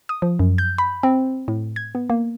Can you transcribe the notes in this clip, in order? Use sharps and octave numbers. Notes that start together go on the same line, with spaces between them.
D#6
F3
F#2
G6
B5
C4
A2
G#6
B3
A#3